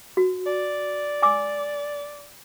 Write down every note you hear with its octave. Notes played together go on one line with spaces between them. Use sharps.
F#4
D5
G#5 D6 E6